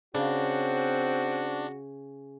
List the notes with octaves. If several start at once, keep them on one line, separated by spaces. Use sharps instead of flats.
C#3 C4 D4 F#4